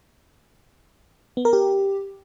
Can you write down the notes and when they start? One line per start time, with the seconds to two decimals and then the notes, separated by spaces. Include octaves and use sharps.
1.37 B3
1.45 A#4
1.53 G4